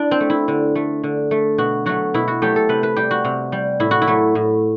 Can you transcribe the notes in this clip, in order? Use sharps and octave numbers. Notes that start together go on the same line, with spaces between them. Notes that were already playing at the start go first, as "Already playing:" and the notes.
Already playing: D4 E4
C4
A3
E4
D3
A3
D3
A3
B2 F#4
F#3 A3 F#4
B2 E4
F#4
F#3 A3 G4
A4
C3 B4
B4
G3 G4
F#4
C3
G3
A2 E4
F#4
E4
F#3 A3
A2